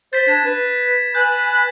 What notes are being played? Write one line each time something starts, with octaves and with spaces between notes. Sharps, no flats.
C5 A6 B6
D4 G#6 E7
B4
B4 G#5 B5 F#6 G6